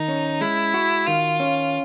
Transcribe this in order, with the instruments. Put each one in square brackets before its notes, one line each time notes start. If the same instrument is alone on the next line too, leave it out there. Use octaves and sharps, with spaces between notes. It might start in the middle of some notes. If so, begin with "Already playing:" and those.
Already playing: [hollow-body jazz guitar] D#3 [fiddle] D#4
[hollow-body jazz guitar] C#4
[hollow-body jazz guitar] G#3 [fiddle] E4
[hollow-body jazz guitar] F#4
[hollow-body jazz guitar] D#3 [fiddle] F4
[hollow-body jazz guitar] C#4